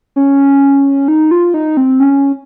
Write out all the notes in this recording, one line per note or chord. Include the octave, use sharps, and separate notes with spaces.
C#4
D#4
F4
D#4
C4
C#4